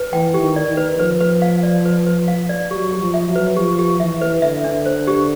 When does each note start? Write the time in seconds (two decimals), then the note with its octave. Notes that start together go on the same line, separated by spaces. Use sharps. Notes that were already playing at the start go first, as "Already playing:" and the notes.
Already playing: B4
0.13 E3 G5
0.34 G4
0.41 D#3
0.56 D5
0.71 D#3
0.77 B4
0.98 F3 B4
1.21 B4
1.42 F5
1.63 D5
1.85 B4
2.06 B4
2.28 F5
2.49 D5
2.71 F#3 G4
2.92 G4
3.00 F3
3.14 E5
3.28 F#3
3.36 B4
3.56 F3 G4
3.79 G4
4.00 E3 E5
4.21 B4
4.42 D3 E5
4.64 D4
4.86 C5
5.07 G4